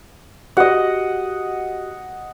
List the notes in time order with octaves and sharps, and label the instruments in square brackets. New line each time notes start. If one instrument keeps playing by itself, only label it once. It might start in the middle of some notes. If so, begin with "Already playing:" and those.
[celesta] F#4 G4 [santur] D#5 F#5